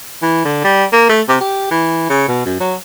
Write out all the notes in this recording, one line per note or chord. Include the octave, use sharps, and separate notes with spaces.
E3
D3
G3
A#3
A3
C3
G4
E3
C#3
B2
F#2
F#3